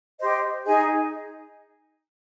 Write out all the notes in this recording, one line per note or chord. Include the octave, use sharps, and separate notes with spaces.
G4 C5 D#5
D#4 G#4 D#5 G#5